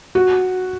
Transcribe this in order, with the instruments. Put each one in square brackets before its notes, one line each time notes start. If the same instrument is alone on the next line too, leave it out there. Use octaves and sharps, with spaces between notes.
[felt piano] F#4